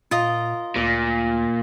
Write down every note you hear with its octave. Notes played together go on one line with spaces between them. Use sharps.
A#2 F4 A#4 D#5
D2 A#2